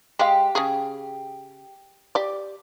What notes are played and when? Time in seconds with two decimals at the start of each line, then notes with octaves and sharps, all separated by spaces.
0.19 G#3 G4 F5
0.55 C#3 G#4
2.15 G4 D5